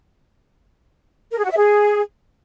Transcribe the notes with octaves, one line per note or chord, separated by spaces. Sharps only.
A#4
G#4
F#4
E5
G#4